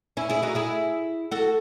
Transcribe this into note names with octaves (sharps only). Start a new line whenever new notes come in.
C#4 E4
E4 G#4
D#4 F#4
E4 G#4
F#4 A4